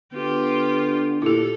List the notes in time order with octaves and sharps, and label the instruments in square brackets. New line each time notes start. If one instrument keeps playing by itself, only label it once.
[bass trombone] D3 [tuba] B3 [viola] F4 G4
[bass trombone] A#2 [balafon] E4 G4 [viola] A4